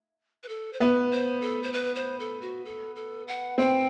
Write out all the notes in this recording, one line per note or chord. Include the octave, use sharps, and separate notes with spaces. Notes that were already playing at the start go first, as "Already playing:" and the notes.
B4
A4
C5
B3 B4
C5
A4
C5
B4
C5
A4
F#4
A4
A4
F#5
C4 G5